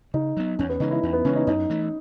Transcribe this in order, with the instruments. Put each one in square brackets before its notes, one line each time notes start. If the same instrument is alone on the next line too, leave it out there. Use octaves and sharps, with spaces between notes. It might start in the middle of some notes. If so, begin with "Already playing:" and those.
[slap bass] C#3 [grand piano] D#4
[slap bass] F#3 B3
[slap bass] E2 [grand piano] C#4
[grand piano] B3
[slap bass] C#3 E3 G#3 [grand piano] D#4
[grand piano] E4
[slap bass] E2 [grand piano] D#4
[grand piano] B3
[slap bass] C#3 E3 G#3 [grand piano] C#4
[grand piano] D#4
[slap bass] F#2 [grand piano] D#4
[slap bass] E3 A3